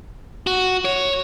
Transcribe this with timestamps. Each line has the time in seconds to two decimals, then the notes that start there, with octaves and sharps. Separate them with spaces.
0.47 F#4
0.85 C#5